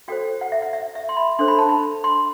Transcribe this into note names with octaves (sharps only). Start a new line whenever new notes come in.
F#4 A4 C5 G5
F#5
E5
F#5
E5
E5
C6
B5
D4 A4 C5 C6
B5
A5
B5
C6